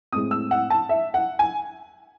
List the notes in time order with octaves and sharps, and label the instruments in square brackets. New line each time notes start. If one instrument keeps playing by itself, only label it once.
[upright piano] A2 G#3 C4 D#6
E6
F#5
A5
E5
F#5
G#5